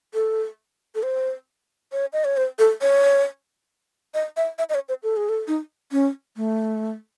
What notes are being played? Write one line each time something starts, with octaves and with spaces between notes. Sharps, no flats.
A4
A4
C5
C#5
D#5
C#5
C5
A4
C#5
D#5
E5
E5
D#5
C#5
C5
A4
G#4
A4
D#4
C#4
A3